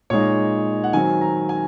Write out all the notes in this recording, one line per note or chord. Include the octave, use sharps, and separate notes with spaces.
A#2 G#3 D#4 C#5
F#5
D#3 F#3 C4 G#5
A#5
G#5